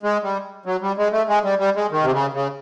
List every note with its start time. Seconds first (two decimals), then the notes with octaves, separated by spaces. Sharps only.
0.03 G#3
0.23 G3
0.66 F#3
0.81 G3
0.97 G#3
1.12 A3
1.28 G#3
1.44 G3
1.59 G3
1.76 G#3
1.91 D#3
2.02 C3
2.12 C#3
2.33 C#3